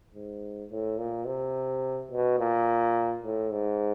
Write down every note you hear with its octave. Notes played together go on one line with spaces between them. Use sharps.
G#2
A2
A#2
C3
B2
A#2
A2
G#2